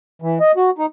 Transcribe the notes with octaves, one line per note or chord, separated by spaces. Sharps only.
E3
D#5
F#4
D#4